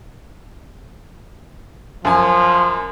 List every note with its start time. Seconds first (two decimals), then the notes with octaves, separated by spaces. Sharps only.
2.05 F#2 F3 G#5